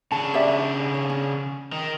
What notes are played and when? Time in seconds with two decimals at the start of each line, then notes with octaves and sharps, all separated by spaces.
0.12 C#3 D4 A5
0.34 G4 D5 E5
0.58 D#4
0.94 C#5
1.10 C#4
1.72 D#3